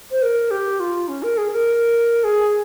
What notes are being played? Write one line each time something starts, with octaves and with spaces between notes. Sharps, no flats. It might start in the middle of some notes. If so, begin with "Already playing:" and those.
C5
A#4
G4
F4
C#4
A#4
G#4
A#4
G#4